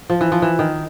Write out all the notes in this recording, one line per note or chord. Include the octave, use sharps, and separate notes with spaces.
F3
E3
F3
E3
D#3